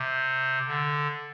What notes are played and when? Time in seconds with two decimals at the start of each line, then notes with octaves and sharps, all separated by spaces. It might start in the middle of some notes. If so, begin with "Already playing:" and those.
Already playing: C3
0.67 D3